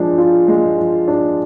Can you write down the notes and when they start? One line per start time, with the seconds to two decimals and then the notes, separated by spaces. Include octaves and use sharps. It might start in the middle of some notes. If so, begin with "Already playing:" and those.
Already playing: F3 G#3 D4
0.18 F4
0.48 G#3
0.78 F3
1.08 D4